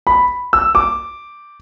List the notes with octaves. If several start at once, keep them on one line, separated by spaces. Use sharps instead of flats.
B5
E6
D6